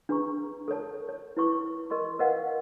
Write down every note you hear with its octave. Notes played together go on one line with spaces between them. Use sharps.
D4 G#4 B4 A#5 C#6
A4 A#4 C#5 A5
C#5
E4 B4 C#6 D6
A#4 D#5 C6 C#6
A#4 B4 D#5 F5 F#5